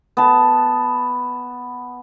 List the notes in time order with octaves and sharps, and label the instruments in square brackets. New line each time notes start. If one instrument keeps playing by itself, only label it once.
[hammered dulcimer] B3 A5